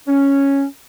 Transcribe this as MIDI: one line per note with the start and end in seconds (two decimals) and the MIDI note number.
0.07 0.64 61